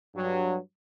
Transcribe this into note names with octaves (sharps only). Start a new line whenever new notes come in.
G2 F#3